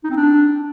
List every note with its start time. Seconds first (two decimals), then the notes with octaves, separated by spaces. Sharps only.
0.04 D#4
0.10 C4
0.17 D4